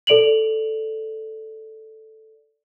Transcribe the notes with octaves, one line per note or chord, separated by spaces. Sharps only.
A4 D5 D7 F7 F#7